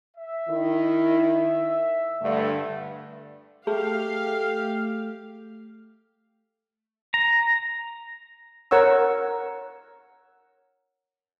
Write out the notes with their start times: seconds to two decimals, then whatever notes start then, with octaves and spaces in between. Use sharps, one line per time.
0.16 E5
0.49 D#3 E4
2.22 G2 D3 A3
3.67 A3 G4 G#4 F5
7.14 A#5
8.71 A#4 C#5 F#5 C#6 E6